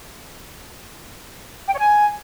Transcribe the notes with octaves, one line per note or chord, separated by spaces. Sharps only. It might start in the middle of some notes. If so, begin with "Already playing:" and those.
G5
C#5
G#5